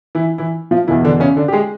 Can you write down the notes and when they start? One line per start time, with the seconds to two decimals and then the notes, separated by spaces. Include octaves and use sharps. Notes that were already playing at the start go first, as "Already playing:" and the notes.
0.15 E3 E4
0.38 E3 E4
0.71 F3 F4
0.87 E2 B2 E3 E4
1.04 D3 D4
1.20 C#3 C#4
1.36 D3 D4
1.48 G4
1.53 G#3 G#4